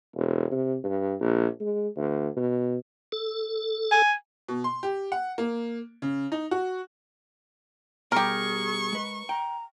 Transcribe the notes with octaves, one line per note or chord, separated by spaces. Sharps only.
E1
C3
G2
A#1
G#3
D2
B2
A4
G#5
B2
C6
G4
F#5
A#3
C#3
D#4
F#4
B2 G3 G4 G#4 A#4 C#6
G#3 B4
G5 A#5